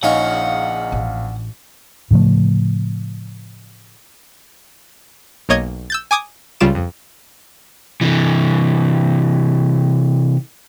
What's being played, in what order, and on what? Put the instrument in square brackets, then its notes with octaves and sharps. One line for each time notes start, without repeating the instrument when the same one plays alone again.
[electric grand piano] A#1 F5 [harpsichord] C#3 D#4 C#5 [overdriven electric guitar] F#5
[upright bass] A1
[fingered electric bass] A2 C#3 F3 A3
[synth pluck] B1 A#3 C#5 D#5 G#6
E6 G6 A6
G#5 D6 D#6 G#6
C#2 C#3 G3 F4 D6 E7
F2
[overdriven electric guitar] C3 E3